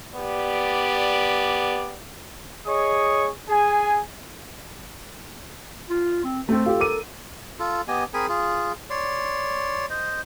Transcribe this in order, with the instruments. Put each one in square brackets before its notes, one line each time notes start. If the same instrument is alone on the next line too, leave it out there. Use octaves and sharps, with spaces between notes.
[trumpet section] B3 G4 D5
G#4 C#5 D#5 C#6 D#6
G#4 G#5
[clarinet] F4
C4
[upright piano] A3 C4 [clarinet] A4
[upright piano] F4 G4
A#4 D6 D#7
[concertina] F4 A4
B3 G4 D#5 G#5
C4 G#4 A#4 G#5 B5
F4 G#4
C#5 D5 C6
C5 D#5